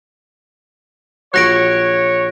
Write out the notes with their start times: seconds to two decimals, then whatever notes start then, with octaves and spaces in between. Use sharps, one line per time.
1.34 A#1 F#3 C#5 F#6 A#6 D7